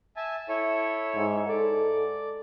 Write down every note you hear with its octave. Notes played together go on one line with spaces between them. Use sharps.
E5 G#5 A5
E4 A4 C#5
G#2
A4 D5